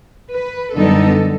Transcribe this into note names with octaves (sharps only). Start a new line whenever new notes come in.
B4
F#2 D3 G3 B3 D#4 A4